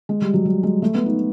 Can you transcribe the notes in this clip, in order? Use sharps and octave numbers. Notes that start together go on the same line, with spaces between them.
G#3
G3
F#3
G3
G#3
A3
B3
D#4